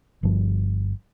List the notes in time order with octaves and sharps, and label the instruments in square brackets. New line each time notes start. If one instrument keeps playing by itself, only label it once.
[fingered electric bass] G1 G2 F3